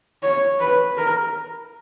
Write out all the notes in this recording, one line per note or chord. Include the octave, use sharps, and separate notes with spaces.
C#5
B4
A#4